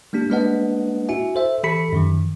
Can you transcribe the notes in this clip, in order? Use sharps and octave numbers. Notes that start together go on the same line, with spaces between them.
G#3 A#3 D4 G4
G#3 A#3 D4 B4 D#5 F#5
E4 F#4 E5 G#5
A4 C5 E5
E3 G4 A4 B5 B6 C#7
F#2 D#3 F3